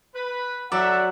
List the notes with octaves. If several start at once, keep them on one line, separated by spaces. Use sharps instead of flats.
B4
F#3 A4 D5 E5 F#5